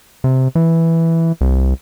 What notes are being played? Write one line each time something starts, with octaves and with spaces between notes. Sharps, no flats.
C3
E3
C2